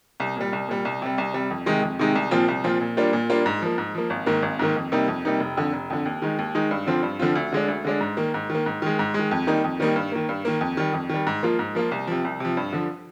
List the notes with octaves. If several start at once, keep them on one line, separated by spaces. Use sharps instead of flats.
C2
A#2 G3
C2
A#2 G3
C2
C3 G3
C2
C3 G3
F2
C3 D#3 G#3 D#4
F2
C3 D#3 G#3 D#4
C2
A#2 F3 C4 F4
C2
A#2 F3 C4 F4
A#2
G3 A#3 D4 F4
A#2
G3 A#3 D4 F4
G#2
F3 A#3
G#2
F3 A#3
G#1
G#2 D#3 A#3
G#1
G#2 D#3 A#3
F2
C3 G3 A#3 D#4
F2
C3 G3 A#3 D#4
F1
F2 D3
F1
F2 D3
D#2
D#3 G#3 D#4
D#2
D#3 G#3 D#4
G2
D3 F3 C4 F4
G2
D3 F3 C4 F4
D2
D3 G#3 D4
D2
D3 G#3 D4
G#2
D#3 A#3
G#2
D#3 A#3
G#2
D#3 G#3
G#2
D#3 G#3
F2
D#3 G3 A#3 D#4
F2
D#3 G3 A#3 D#4
G2
D#3 A#3
G2
D#3 A#3
F2
D#3 G3
F2
D#3 G3
G#2
F3 A#3 F4
G#2
F3 A#3 F4
C2
C3 F3
C2
C3 F3
G2
D3 F3